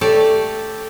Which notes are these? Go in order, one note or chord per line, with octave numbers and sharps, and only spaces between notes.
A3 G4 A4 C#5 D5